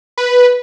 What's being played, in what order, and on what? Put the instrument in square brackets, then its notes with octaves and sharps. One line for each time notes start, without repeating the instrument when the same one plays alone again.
[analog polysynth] B4